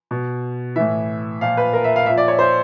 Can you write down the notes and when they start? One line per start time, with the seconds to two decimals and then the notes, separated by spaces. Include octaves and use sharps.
0.11 B2
0.76 A2 E3 E5
1.41 A#2 F3 F5
1.57 B4
1.73 A#4
1.84 E5
1.96 F5
2.06 A#2 F3 E5
2.18 D5
2.28 C#5
2.39 C5